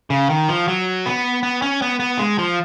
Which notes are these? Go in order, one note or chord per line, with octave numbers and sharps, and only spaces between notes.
C#3
D#3
F3
F#3
B3
B3
C#4
B3
B3
G#3
F3